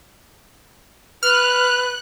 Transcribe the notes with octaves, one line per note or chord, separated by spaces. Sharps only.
B4 F6 F#6